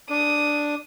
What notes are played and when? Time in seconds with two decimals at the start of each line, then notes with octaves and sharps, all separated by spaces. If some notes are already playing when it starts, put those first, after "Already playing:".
0.10 D4 D#6